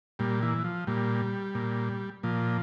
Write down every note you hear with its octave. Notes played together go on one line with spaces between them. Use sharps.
A#2 G3
E3
F3
A#2 G3
A#2
A#2 F3